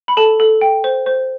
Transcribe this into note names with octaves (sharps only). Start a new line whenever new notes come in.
B5
A4 A5
A4
G5
C5
C5